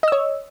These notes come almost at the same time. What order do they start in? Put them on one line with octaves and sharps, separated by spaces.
D#5 E6 C#5